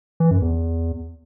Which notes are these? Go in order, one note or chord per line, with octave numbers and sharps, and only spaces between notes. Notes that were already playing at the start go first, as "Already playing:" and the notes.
E3
F#2
E2